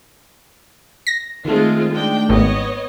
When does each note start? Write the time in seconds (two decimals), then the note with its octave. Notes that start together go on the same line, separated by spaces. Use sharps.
1.07 A#6
1.45 D#3 G#3 A3 C4 F4
1.91 G#3 D4 G5
2.29 G#1 B3 C#5 D#5